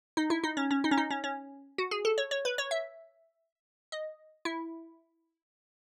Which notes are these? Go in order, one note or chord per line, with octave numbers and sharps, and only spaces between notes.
D#4
E4
D#4
C#4
C#4
D#4
C#4
D#4
C#4
C#4
F#4
G#4
A4
C#5
C#5
B4
C#5
E5
D#5
E4